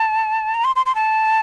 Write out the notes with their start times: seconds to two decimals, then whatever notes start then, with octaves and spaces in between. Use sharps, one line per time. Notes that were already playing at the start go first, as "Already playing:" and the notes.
Already playing: A5
0.54 A#5
0.64 C6
0.76 C6
0.86 C6
0.95 A5